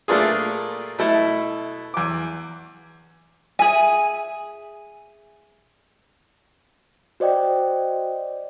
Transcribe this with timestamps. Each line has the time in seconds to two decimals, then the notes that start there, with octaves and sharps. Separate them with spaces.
0.08 A#2 A3 A#3 D4 F4 G#4
0.99 B2 A3 E4
1.94 E2 D6
3.59 G#4 E5 G#5
7.20 F#4 C5 D5 D#5 G5